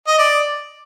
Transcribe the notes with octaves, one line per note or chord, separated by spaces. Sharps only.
D#5
D5